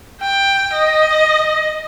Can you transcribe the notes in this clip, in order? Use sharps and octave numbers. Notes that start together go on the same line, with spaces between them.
G5
D#5